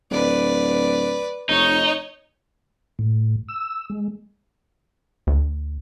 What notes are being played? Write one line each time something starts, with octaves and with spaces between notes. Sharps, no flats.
D1 B4 D5
F1 D#4 C#5 C#6
A2
E6
G#3
D2